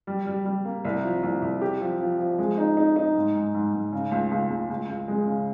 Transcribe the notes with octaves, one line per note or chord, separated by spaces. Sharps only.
G3
G3
G3
A#3
C2
F3
C2
C2
G4
F3
F3
F3
G#3
D#4
D#4
D#4
G#2
G#2
G#2
G#2
C#3
C#2
C#2
C#2
C#2
C#2
G#3
C#3